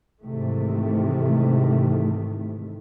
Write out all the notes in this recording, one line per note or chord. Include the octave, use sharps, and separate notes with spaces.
G#2 C3 D#3 E3 A3